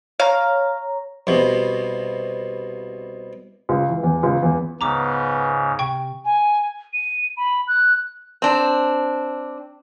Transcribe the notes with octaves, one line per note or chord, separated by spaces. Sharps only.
C#5 F5 A#5
C2 B2
C#2
E3
E2
C#2
E2
C#2 G#2 C#3 B3 A#5 D6
C3 G5 C#6
G#5
D#7
B5
F#6
C4 D4